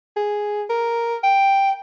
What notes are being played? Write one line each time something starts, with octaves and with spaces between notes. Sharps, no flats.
G#4
A#4
G5